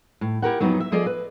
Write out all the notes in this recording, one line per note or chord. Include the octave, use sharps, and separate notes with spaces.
A2
E4 G4 A#4 F#5
F2 F#3 B3 D#4
E5
F3 G#4 A4 D5 D#5 F5
B4